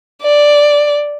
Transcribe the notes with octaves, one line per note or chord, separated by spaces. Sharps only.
D5